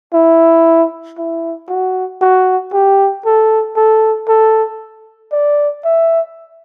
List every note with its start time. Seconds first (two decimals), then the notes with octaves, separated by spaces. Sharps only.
0.14 E4
1.18 E4
1.69 F#4
2.21 F#4
2.73 G4
3.25 A4
3.76 A4
4.28 A4
5.32 D5
5.85 E5